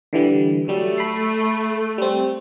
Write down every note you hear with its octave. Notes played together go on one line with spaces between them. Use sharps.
D3 E3 G3
F#3 G3 A3
B5 C7
G3 C4